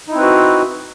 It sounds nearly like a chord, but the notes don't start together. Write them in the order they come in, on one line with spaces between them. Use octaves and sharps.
D#4 E4 C4 B4 F#4